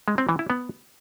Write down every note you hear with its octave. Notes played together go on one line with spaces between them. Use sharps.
G#3
C4
E3
E4
B3